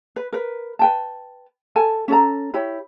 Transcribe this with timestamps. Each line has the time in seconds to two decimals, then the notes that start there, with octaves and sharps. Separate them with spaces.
0.16 B4
0.33 A#4 B4
0.79 B4 G5 A5
1.76 A4 G#5 A5
2.08 C#4 A4 A#5
2.54 E4 G4 C#5 B5